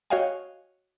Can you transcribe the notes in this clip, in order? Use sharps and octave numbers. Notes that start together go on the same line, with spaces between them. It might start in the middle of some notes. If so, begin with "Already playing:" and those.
F#4 C#5 D#5 F5 G5 G#5